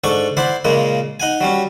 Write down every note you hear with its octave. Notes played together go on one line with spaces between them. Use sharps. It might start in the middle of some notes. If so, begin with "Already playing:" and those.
G#2 D4 A4 C#6
E4 C5 D5 F#5
A#2 C#3 G#3 A#3
D#4 F#5 G#5
F#3 G3 C#4